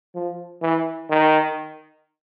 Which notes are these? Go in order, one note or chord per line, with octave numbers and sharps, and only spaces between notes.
F3
E3
D#3